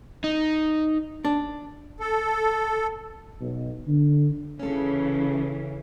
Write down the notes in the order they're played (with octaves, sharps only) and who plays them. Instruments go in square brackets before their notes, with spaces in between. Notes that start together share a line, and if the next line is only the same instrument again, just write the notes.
[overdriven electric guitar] D#4
[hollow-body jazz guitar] D4
[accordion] A4
[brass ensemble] B1
D3
[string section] C#3 E3 [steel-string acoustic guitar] C#4 A4